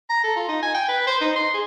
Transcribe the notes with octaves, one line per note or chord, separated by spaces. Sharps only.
A#5
A4
F4
D#4
G#5
G5
B4
C5
D#4
C6
G#4